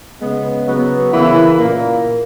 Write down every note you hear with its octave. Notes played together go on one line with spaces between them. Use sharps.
C#3 G#3 B3
C#3 F#3 B3
C#3 E3 A#3 E4
A#2 A#3